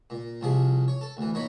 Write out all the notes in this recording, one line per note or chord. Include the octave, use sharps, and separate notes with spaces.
A#2
C2 C3 F3 G#4
C#5
A4
D2 E3
A#2 D#4 C#5 B5